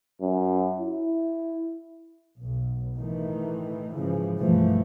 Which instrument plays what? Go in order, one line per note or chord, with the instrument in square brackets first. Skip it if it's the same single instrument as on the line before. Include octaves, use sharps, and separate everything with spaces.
[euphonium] F#2
E4
[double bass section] B1
A2 D#3 E3 A3
G#2 C#3 E3 F3
B1 G2 E3 F3 A3